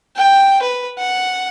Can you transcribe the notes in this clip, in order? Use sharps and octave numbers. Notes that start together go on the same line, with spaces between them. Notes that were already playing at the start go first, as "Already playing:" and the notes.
G5
B4
F#5